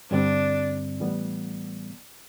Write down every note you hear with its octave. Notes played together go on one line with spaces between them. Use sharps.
G2 D3 G3 C4 D4
A2 E3 G3 B3